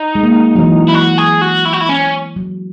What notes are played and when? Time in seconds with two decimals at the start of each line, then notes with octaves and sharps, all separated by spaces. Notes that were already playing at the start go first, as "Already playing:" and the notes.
Already playing: D#4
0.15 G#3
0.23 A#3
0.55 F#3
0.59 E3
0.88 E4
0.94 F#4
1.18 G#4
1.42 F#4
1.65 E4
1.73 F#4
1.81 E4
1.89 C#4
2.36 F#3